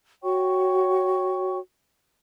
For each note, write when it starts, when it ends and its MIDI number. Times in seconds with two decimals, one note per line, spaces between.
0.23 1.57 66
0.23 1.57 73
0.23 1.57 79
0.23 1.57 85